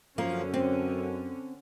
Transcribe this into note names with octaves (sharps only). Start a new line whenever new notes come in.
F#2 D3 F3 A#3 C#4
C4